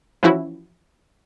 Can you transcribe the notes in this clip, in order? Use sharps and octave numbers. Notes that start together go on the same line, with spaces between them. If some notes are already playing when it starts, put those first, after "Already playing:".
E3 F3 C#4 E4 F#4